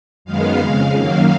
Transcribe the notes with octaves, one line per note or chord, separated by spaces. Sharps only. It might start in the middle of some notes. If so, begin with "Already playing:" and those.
F#2 D#3 G#3 B3 F5
F2 C#3 G#3
F#2 D#3 F#3 A#3 F5